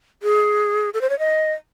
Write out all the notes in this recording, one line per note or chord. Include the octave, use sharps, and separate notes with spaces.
G#4
A4
C5
C#5
D#5